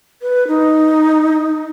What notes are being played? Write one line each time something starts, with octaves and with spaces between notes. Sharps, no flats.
B4
D#4